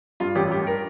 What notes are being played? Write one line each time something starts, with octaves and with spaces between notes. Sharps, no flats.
G2 F4
A1 G4
G2 G4
A#4